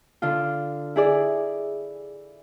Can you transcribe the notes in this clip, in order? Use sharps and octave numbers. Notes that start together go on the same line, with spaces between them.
D3 F4
E4 G#4 D5